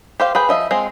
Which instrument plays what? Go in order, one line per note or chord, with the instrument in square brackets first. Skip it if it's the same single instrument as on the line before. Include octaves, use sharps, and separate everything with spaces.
[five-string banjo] G4 C5 F5
G#4 B4 G5
F3 D#5 E5
G#3 C4 F4 G#4